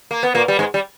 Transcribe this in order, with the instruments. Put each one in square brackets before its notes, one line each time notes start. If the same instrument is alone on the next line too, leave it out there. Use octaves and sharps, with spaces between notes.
[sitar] A#3
B3
A#2 A#3
G3
G#2 G#3
G3